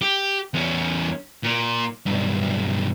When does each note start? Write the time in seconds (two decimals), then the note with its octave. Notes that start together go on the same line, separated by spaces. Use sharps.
0.02 G4
0.54 E2 C#4
1.44 A#2
2.06 B1 G2